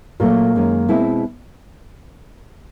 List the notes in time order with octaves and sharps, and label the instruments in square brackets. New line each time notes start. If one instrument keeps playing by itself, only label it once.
[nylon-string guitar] A#2 F#3 A3 [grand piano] A#3
[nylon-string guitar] F#2 D#3 G#3 C#4
B2 G#3 C4 E4